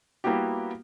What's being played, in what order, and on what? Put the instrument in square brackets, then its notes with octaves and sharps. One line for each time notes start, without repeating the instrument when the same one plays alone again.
[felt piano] G3 A#3 B3 E4 F#4 G4